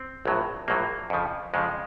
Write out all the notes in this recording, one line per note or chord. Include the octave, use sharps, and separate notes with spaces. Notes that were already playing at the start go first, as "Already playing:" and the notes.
Already playing: C4
A#1 A2 F#3
A#1 A2 F#3 A#3
F2 C#3 F3
F2 C#3 F3 G#3